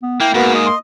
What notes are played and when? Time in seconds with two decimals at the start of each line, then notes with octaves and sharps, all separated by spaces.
0.03 B3
0.21 A#3 E4 G5
0.34 G#2 A#3 B3 F#4
0.55 D#5
0.66 C6